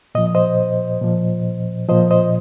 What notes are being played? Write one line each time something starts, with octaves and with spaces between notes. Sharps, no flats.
A#2 F3 D#5
C5 D#5
A#2 F3
A#2 F3 C5 D#5
C5 D#5